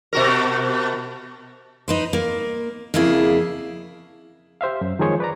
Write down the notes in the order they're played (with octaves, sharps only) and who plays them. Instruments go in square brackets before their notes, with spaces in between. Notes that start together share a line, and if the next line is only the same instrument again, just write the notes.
[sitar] B2 F#4 A#4
[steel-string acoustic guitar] D#4 B4 C5
A#3
F2 C#3 A#3 E4 G#4
[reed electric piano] G4 C5 E5 F5
F#2
D#3 F3 G#3 G#4 C5 C#5
B4 D5 A#5